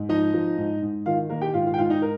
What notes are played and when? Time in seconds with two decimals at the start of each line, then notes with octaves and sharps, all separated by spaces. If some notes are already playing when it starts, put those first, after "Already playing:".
Already playing: G#2
0.09 F3 D#4 D#5
0.34 F3
0.58 G#2
0.82 G#2
1.06 D#3 F4 F5
1.29 D#3 A#3 A#4
1.42 G4 G5
1.54 G#2 F4 F5
1.67 F4 F5
1.74 G5
1.78 G#2 F4 F5
1.90 D#4 D#5
2.02 A#4